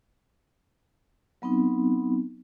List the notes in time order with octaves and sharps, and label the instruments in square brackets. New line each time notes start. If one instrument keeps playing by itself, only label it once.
[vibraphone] F#3 B3 C4 D#4